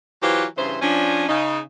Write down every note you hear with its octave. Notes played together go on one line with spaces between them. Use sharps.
E3 F#3 F4 G4 B4 C5
G2 C#3 E3 C5
F3 C#4 D4
C#3 D#4